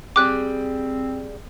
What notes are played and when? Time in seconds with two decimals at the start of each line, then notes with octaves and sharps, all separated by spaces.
0.16 G3 C4 G#4 G5 D6 F#6